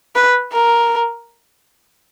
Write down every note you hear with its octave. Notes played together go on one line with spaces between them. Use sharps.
B4
A#4